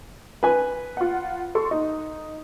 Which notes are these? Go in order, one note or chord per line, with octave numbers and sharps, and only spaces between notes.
B4 G#5
F4 F#5
A4 C6 C#6
D#4